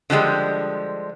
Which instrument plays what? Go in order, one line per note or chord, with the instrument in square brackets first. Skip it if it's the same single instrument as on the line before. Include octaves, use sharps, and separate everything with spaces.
[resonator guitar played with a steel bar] D3 F3 G3 G#3